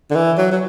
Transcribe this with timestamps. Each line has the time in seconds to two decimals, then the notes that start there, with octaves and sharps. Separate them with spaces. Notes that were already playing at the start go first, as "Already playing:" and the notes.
0.10 D3
0.16 E3
0.37 F#3
0.52 F#3